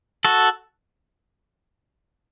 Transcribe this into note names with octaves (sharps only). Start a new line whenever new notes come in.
F#4 A4